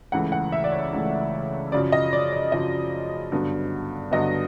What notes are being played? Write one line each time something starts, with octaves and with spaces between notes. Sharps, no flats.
C#2 C#3 E3 A3 F#5
F#5
E5
D5
C#5
C#2 C#3 E3 A3
F#2 C#3 F3 D5
D#5
D5
D5
F#2 C#3 F3 D#5
G2 D3 F#3 B3
G2 D3 F#3 B3 D#5